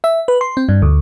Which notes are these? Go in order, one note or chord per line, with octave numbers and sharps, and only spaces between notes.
E5
B4
C6
C4
G2
D2